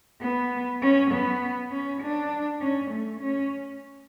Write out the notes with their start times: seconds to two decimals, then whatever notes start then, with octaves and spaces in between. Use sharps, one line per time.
0.22 B3
0.82 C#4
1.11 B3
1.71 C#4
2.02 D4
2.61 C#4
2.91 A3
3.21 C#4